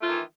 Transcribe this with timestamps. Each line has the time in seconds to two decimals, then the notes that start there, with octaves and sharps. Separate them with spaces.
0.01 A3
0.03 F4
0.06 D#3
0.08 E3